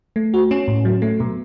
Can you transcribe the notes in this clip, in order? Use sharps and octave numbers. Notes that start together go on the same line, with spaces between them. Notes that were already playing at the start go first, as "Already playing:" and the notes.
A3
F#4
C#4
A2
F#3
A3
B2